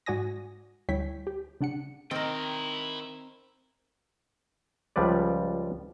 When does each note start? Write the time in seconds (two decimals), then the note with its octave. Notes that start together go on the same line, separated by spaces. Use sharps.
0.06 G#2 F#4 D5 G#5 D#6 A#6
0.89 D2 G3 E4 C#5 G5 B6
1.27 G4
1.61 C#3 D4 F#5 C#7
2.11 D#3 C4 E4 A#4 G5
4.96 C#2 F3 G3 B4 D5